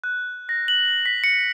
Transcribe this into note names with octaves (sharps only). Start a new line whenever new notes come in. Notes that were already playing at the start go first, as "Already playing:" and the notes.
F#6
A#6
F#7
B6
C#7